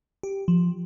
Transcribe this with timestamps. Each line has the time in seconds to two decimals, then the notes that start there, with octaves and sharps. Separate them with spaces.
0.23 G4
0.48 F3